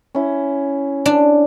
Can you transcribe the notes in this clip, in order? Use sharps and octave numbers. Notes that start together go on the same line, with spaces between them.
C#4 E4
D4